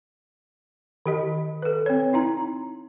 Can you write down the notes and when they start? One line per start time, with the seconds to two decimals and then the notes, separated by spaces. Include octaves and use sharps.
1.06 D#3 G4 D#5
1.62 A4 B4
1.86 C4 C#5
2.13 D#4 E4 A#5